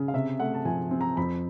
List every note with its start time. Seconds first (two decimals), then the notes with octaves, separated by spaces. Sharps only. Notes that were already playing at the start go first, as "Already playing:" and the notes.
Already playing: C#3
0.08 F5
0.14 C3 E5
0.40 A3 F#5
0.54 A5
0.65 F3 G#5
0.91 C4
1.01 A#5
1.17 F2 B5